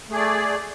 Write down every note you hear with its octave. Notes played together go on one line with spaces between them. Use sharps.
A3 G#4 D5